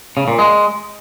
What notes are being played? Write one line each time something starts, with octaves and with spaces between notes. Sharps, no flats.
C#3
A#2
G#3